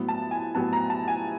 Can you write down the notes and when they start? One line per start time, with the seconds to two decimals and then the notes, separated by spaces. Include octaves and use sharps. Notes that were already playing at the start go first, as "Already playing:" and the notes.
Already playing: A2 F#3 B3 E4
0.09 A5
0.31 G#5
0.55 A2 F#3 B3 E4 A5
0.73 A#5
0.90 A5
1.08 G#5